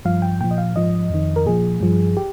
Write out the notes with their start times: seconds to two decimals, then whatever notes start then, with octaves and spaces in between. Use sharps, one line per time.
0.05 G2 F3 F5
0.22 G5
0.41 A#2 F3 G5
0.51 D#5
0.58 F5
0.75 G#2 F3 D#5
1.10 F2 D#3
1.36 A#4
1.46 A#2 F3 G#4
1.81 G2 F3
2.17 G4